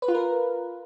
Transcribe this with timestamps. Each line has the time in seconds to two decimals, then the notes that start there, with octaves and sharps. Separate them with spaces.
0.02 B4
0.08 F4
0.14 A#4